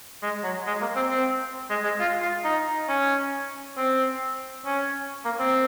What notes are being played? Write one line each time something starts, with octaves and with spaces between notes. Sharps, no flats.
G#3
F#3
G#3
A#3
C4
C4
G#3
G#3
F4
F4
D#4
C#4
C4
C#4
A#3
C4